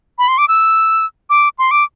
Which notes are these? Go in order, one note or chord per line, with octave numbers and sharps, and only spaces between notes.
B5
C6
D6
E6
D6
C6
D6